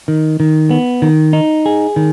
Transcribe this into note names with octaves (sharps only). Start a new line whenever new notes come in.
D#3
D#3
B3
D#3
D#4
G#4
D#3